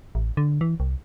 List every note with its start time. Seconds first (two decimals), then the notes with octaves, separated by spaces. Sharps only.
0.15 A1
0.37 D3
0.61 E3
0.80 C2